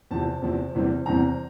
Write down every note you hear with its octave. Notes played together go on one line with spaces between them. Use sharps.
E2 C3 F3 C4 A5
E2 C3 F3 C4
E2 C3 E3 G3 C4
E2 C3 E3 G3 C4 A#5